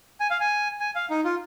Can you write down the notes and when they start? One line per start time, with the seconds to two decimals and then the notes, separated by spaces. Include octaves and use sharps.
0.20 G#5
0.30 F5
0.40 G#5
0.80 G#5
0.95 F5
1.10 D#4
1.24 F4